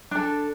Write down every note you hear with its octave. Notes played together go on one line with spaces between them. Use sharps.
D4 A4